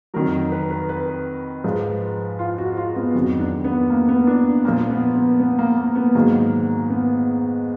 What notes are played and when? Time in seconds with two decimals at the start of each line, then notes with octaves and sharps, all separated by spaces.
0.14 F2 D#3 F#3 A#4
0.52 B4
0.71 B4
0.89 B4
1.64 G#2 F3
2.39 F4
2.58 F#4
2.77 F4
2.96 B3
3.14 F2 D#3 F#3
3.40 D4
3.64 B3
3.90 A#3
4.09 B3
4.27 D4
4.64 A#2 F3 A#3
4.90 B3
5.15 B3
5.40 B3
5.59 A#3
5.77 A#3
5.96 B3
6.15 G#2 D#3 F#3 A#3
6.90 B3